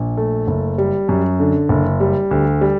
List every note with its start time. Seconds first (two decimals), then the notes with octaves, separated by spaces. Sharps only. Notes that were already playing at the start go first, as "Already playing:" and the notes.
Already playing: A#1
0.17 A3
0.48 F#1
0.78 G3
1.09 F#2
1.40 D3
1.69 F#1
2.00 G3
2.31 D2
2.61 G3